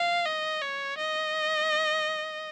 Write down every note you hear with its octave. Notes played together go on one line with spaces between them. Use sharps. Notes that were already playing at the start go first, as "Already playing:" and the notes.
Already playing: F5
D#5
C#5
D#5